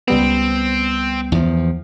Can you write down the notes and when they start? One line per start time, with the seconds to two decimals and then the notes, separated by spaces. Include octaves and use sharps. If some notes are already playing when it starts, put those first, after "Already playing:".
0.08 C#2 G3 B3 C4
1.32 E2 F3